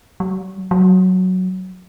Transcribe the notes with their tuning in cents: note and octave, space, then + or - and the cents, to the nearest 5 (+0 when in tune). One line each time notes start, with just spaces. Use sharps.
F#3 +45
F#3 +0